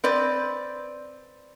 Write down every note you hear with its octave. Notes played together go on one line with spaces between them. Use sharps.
C4 B4 D5